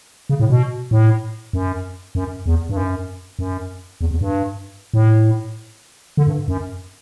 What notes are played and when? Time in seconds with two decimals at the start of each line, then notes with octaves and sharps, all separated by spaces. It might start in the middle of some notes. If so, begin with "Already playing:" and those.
0.30 C#3
0.40 A2
0.50 B2
0.91 A2
1.53 F#2
2.15 F#2
2.46 E2
2.69 G2
2.77 F#2
3.39 F#2
4.01 E2
4.11 E2
4.21 G2
4.94 A2
6.17 D3
6.27 G2
6.48 F#2